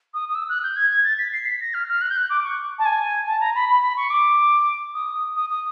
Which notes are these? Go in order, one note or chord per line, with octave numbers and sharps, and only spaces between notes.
D#6
D#6
E6
F#6
G6
G#6
G#6
A6
B6
C7
B6
A#6
F6
F6
F#6
G6
F#6
D6
C#6
A5
G#5
A5
A#5
B5
B5
B5
C#6
D6
D#6
D#6
D#6